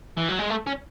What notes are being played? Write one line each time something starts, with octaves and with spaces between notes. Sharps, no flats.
E3
F#3
G#3
A3
C#4